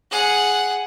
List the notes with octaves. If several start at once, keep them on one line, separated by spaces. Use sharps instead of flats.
G#4 F#5